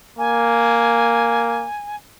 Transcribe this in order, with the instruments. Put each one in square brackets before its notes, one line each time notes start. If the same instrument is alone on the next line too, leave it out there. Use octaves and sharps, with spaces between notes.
[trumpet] A#3 [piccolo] G#5